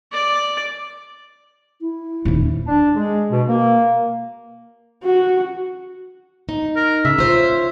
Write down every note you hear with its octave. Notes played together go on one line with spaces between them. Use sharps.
D5
E4
D#1 D#2
D4
G#3
B2
A#3
F#4
D#4
A#4
C#3 E5
F4 C5 C#5